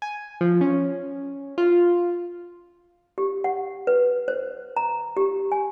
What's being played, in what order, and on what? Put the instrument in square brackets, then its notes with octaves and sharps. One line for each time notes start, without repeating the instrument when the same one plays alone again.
[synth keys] G#5
F3
C#4
F4
[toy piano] G4
F#5
B4
C5
A#5
G4
G#5